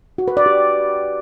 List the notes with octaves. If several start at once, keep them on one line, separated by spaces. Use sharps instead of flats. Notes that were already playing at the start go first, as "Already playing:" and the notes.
F#4
B4
D5
G4